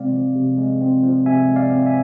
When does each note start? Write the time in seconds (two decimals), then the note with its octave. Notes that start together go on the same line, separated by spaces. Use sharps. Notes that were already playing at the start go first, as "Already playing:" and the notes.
Already playing: C3 G#3 C4 D5 F5
0.12 F3
0.35 C3
0.58 G#3
0.81 C4
1.03 F3
1.26 C3 E5 G#5
1.49 G#3
1.56 D5 F5
1.71 C4
1.86 E5 G#5